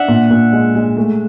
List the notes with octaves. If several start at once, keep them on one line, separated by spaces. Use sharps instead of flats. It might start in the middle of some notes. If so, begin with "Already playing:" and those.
Already playing: D4 E5 F#5
A#2
A#2
G#3
G#3
A3